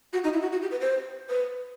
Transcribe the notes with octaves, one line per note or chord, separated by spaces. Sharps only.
F#4
D#4
E4
F#4
F#4
G4
B4
C5
B4